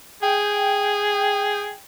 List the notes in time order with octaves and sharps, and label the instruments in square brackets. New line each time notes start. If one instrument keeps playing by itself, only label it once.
[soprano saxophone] G#4 [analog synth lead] G5